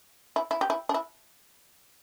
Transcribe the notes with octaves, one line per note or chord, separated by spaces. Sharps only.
E4
E4
G4
E4
D4
E4